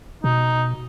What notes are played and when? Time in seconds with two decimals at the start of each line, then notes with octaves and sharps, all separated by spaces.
0.24 B2 D#4